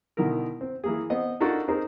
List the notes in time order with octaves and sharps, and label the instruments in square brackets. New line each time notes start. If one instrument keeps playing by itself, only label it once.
[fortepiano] B2 D3 D#3 E4 A#4
C4
E3 A#3 G#4
B3 C4 D#5
D4 D#4 F4 F#4 A4 A#4
C4 D#4 G#4 A#4 C5